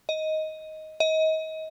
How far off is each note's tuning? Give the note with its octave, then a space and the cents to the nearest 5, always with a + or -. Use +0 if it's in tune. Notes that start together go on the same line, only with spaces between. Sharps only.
D#5 +10
D#5 +30